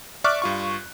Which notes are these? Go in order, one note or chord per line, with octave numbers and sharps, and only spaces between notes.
D5 E5 C#6 D6 F6 F#6
G2 F4 C#6